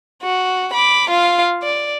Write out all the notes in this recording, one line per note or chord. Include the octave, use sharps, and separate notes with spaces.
F#4
B5 D6
F4 F5
D5